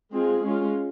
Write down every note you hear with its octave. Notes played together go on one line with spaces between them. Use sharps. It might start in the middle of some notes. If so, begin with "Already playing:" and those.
G#3 C4 F4 G#4
G#3 C#4 F4